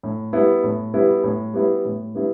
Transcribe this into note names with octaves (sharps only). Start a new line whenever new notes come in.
A2
G3 B3 E4
A2
G3 B3 E4
A2
G3 B3 E4
A2
G3 B3 E4